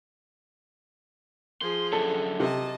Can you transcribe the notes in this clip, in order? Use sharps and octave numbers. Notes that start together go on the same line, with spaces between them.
F3 G#4 C6
F#2 D3 A4
C3 D#5 A5